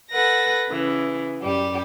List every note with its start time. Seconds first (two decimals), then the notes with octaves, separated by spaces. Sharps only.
0.13 A4 B4 F#5 A#6
0.69 C#3 E3
1.42 F#2 G3 G4